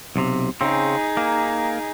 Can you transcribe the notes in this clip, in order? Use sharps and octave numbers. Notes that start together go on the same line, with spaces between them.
B1 C3
C#3 C4 D#4 G#4
A#3